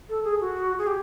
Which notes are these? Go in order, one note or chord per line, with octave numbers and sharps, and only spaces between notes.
A4
G#4
F#4
G#4
G4